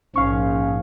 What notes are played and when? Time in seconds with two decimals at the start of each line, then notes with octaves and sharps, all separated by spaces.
0.16 A#1 G#2 F3 C#4 F5 C#6